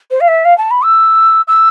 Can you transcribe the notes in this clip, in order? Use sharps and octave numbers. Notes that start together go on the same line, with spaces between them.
C5
F5
E5
F5
A5
B5
E6
E6